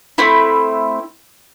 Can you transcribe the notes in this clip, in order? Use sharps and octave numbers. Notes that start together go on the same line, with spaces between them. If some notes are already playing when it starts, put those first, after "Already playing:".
A3 C4 E4